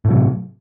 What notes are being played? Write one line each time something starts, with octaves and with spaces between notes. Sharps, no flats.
A2 C3 F#3